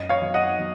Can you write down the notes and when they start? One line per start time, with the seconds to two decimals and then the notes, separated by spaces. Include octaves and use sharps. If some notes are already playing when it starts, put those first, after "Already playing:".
Already playing: F#2 D#5
0.09 C#5 F5
0.22 F#3
0.34 D#5 F#5
0.59 F#3